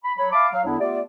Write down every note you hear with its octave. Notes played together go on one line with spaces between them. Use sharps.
B5
F#3 C#5 B5
E5 F5 A5 B5 D6
F#3 F5
E2 D3 B3 D4 E4
A3 B3 F4 G4 D5